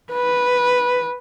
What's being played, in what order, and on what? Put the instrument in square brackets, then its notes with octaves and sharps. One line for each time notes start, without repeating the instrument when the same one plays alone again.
[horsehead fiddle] B4